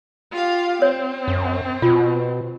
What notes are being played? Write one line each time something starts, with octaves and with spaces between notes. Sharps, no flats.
F4 G4 F5
C4 C#5
F#2
B2 F4